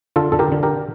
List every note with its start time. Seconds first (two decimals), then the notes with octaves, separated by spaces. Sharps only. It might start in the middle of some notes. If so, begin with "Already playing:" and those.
0.16 D3 F4 A4
0.32 D3 A4
0.39 G4 A#4
0.52 D3
0.63 G4 A#4